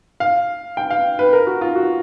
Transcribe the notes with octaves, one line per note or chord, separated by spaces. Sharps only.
F5
G5
F5
B4
A#4
F#4
F4
F#4